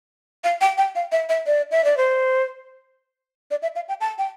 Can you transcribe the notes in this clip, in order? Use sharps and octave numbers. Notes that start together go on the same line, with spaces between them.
F5
G5
G5
F5
E5
E5
D5
E5
D5
C5
D5
E5
F5
G5
A5
G5